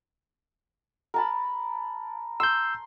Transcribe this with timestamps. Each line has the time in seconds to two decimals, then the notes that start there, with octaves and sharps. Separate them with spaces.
1.14 A#4 A5 B5
2.40 C6 E6 G6